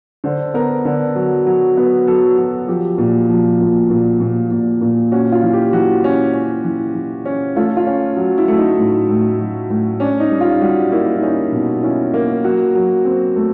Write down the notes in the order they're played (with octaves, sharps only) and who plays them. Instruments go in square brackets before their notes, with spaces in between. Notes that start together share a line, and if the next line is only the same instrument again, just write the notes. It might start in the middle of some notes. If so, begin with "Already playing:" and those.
[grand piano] D3 C5
B3 A#4
D3
F#3
F#3
B3
F#3 A4
F#3
F3 G4
A#2
F3
A#2
A#2
A#2
A#2
A#2
C#4 F#4
F4
E3
G4
E3 F#4
C#4
C#4
E3
E3
C#4
A3 F4
F4
C#4
F#3
E4
A3
D#4
A2
A2
F#3
A2
C#4 D4
D#4
G3
F4
G3 F#4
A#3 E4
E4
C#4 D#4
B2
C#4 E4
A#3
F#3 F#4
F#3
C4
A3